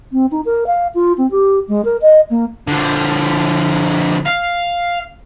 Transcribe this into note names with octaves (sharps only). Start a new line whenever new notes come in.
C4
D#4
A#4
F5
F4
C4
G4
G#3
A#4
D#5
A#3
D3 F3
F5